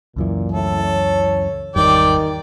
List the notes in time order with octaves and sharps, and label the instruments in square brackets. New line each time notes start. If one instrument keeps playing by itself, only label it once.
[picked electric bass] C#2 F#2 E3 [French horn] A#2
[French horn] A2 [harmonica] A4
[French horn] C#5
[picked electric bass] G#1 E2 G3 [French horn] D#3 [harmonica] D5 G5 D6